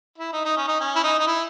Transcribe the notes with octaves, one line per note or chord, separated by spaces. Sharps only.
E4
D#4
D#4
C#4
D#4
C#4
E4
D#4
D#4
E4